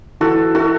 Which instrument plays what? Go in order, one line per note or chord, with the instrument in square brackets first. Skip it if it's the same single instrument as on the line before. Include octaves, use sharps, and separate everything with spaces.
[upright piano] E3 [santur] F#4 A4
[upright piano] E4 [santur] F#4 A4